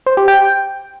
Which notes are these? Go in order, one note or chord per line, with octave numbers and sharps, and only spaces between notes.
C5
G4
G5